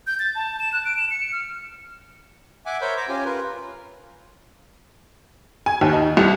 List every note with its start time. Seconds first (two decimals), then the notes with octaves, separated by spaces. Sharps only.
0.07 G6
0.19 A6
0.35 A5
0.60 E7
0.73 F#6
0.85 D7
0.97 E7
1.10 C#7
1.32 F6
2.66 E5 F#5 G#5 D6
2.81 A#4 C5 C#5 E5 B5 G6
2.97 C5 A#5 D6
3.08 C#4 F4 G4 G#5
3.25 F4 A#4 B4
5.66 G#5
5.81 D#2
5.93 D#4
6.17 C2